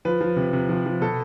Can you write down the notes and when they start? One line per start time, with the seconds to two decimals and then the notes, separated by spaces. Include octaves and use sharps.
0.05 F3 B4
0.21 F3
0.36 C3
0.53 C3
0.69 F3
0.86 F3
1.01 B2 A4